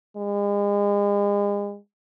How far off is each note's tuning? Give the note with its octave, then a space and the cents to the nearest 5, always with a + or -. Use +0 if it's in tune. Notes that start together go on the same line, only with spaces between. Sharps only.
G#3 -40